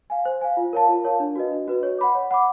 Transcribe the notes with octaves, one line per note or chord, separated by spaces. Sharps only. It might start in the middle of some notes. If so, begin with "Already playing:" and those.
F5 G#5
C5
F5 G#5
F4
A#4 C#5 F5 A5
F4
A#4 C#5 F5 A5
D4
F#4 B4 D#5
D4
F#4 B4 D#5
C#5
F#5 B5 D6
C#5
F#5 B5 D6